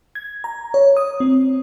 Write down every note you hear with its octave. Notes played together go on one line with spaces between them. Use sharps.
G#6
A#5
C#5
D#6
C4